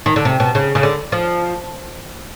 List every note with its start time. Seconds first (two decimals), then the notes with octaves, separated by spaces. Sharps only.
0.06 D#3
0.16 D3
0.25 C3
0.40 B2
0.55 C#3
0.75 C#3
0.83 D3
1.12 F3